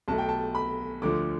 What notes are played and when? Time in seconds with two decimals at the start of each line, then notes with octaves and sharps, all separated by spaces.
0.08 B1 B2 A3 A5
0.18 G5
0.29 A5
0.55 B5
1.02 D2 D3 F3 A3 D6